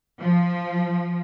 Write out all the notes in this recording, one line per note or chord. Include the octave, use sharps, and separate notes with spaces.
F3